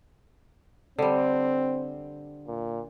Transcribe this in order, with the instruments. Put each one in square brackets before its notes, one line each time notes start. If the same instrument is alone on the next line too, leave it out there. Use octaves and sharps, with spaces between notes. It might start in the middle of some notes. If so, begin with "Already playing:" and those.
[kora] D3 G3 [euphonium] C4
[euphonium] A#2